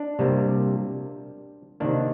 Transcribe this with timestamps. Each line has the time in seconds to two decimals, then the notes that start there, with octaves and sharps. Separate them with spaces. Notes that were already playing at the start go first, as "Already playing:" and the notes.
Already playing: D4
0.19 C3 G3 A#3
1.80 C3 D#3 A#3 D4